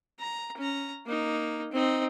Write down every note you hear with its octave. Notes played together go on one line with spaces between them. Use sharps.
A#5
C#4 A#5
A#3 D#4
C4 D#4